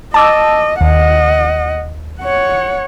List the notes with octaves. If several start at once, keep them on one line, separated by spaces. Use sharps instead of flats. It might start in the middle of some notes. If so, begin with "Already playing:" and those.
D#5 A5 D6 E6
D#2 D#5 F#5
C#5 F#5